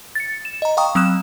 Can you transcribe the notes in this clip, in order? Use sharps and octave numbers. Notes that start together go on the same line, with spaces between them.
A6 C#7
E7
D#5 A#5
F5 G5 A#5 C#6 D#6
F#3 C4 D#6 E6 F#6 E7